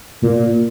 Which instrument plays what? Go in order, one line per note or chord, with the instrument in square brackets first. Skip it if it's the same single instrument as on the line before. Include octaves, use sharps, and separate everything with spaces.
[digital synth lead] A#2